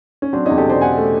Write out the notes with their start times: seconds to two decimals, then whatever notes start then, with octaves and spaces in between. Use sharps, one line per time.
0.22 C#4
0.33 F#3 C4 D4
0.46 E2 C#4 D#4
0.57 G4 A4
0.66 B2 C5 D5
0.81 B2 F#5 G#5
0.97 A3